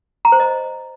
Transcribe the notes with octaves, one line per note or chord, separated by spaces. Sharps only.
A#5
C5
D#5